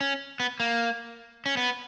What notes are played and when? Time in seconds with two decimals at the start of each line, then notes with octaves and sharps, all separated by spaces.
0.01 C#4
0.40 B3
0.60 A#3
1.46 C#4
1.57 B3